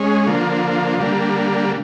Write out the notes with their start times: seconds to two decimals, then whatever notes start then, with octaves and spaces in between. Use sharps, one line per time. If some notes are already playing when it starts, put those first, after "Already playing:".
Already playing: G#3 C#4
0.26 D3 F3 A#3
1.00 D3 G3 A#3